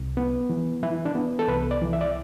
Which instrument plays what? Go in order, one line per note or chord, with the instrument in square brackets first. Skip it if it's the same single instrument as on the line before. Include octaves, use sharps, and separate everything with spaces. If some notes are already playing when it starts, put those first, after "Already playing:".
Already playing: [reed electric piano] C2
B3
E3
E3 E4
D4
B3
A4
C2 B4
D5
E3
E5
D5